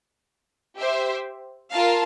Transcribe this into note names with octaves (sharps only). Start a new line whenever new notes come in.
G4 C5 E5
F4 A#4 F5 A5